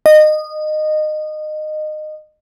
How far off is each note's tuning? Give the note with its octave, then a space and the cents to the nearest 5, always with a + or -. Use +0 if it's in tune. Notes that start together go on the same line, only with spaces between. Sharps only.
D#5 -20